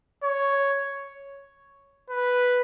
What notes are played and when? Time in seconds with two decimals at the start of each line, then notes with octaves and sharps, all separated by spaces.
0.24 C#5
2.10 B4